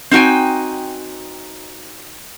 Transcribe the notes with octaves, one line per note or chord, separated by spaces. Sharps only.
C4 D#4 F#4 G5 G#5